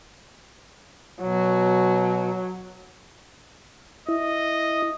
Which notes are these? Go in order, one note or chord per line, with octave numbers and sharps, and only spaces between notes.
B2 F#3
E4 D#5